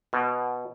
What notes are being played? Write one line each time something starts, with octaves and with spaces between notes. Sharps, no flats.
B2